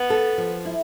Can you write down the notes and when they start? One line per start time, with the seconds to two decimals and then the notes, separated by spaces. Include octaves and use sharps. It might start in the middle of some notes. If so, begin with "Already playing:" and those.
Already playing: B3
0.10 A4
0.38 F3
0.65 E4